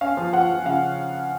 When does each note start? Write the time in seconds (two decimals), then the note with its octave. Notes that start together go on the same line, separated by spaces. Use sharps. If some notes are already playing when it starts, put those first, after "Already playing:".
0.01 C#4 F5
0.17 F3
0.33 F3 F#5
0.50 F3
0.66 C#3 F5